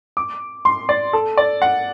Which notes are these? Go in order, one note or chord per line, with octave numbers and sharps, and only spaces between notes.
D6
C6
D5
A4
D5
F#5